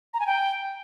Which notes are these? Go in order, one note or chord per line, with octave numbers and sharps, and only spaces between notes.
A#5
G#5
G5